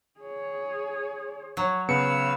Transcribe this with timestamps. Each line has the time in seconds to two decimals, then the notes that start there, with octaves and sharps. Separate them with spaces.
0.20 G#4 C#5
1.57 F#3 C#5
1.89 C#3 B3 B4 C#5 F5 E6 C#7